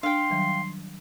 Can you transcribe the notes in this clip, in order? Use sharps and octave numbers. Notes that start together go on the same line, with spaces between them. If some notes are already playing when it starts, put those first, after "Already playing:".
D4 F5 G5 C6
D#3 F#3 G3